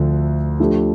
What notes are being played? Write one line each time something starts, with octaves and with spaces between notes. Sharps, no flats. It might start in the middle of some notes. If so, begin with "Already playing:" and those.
Already playing: D2 D3 F3 A3
F3 A3 D4 G4